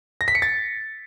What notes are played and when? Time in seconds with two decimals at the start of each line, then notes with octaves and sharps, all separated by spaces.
0.21 A#6
0.28 B6
0.35 C#7
0.42 A6